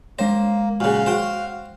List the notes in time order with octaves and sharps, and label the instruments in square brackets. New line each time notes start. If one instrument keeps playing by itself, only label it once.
[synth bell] G#3 C#5 [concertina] A#3 [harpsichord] C5
[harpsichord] A#2 C#3 [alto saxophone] F#4 [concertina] F5
[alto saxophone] F#4 [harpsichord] C5 G5